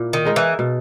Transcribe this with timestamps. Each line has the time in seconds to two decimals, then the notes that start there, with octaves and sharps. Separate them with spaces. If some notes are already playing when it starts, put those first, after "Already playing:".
Already playing: A#2 A#3 E4
0.13 D#3
0.25 G#3 D#4 A#4
0.36 E3
0.59 B2